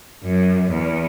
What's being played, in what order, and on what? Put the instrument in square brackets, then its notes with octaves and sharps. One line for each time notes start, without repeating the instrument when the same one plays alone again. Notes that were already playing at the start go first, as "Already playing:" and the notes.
[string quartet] F#2
E2